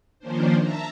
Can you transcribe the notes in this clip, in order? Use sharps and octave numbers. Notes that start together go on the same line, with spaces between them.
D#3 F3 A#3 C#4 D4 C5
E5 A5 A#5